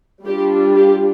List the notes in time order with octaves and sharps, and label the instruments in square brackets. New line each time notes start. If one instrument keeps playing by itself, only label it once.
[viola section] G3 D4 F4 G4
G4